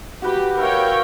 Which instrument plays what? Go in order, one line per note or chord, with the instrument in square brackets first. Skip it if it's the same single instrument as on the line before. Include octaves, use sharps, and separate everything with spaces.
[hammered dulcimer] F#4 B4 [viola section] G4
[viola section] A#4 C#5 G5 [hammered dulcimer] B4 E5 F5